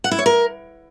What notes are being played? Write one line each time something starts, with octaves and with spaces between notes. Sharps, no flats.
F#5
E4
C#5
A#4